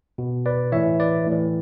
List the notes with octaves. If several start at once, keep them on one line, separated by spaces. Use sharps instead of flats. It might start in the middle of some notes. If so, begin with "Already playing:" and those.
B2
B4 D5
A2 E3 C#5 E5
B4 D5
A2
E3